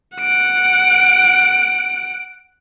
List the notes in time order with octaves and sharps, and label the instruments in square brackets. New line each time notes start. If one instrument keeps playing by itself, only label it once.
[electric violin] F#5 D7